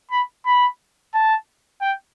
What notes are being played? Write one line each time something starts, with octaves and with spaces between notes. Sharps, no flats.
B5
B5
A5
G5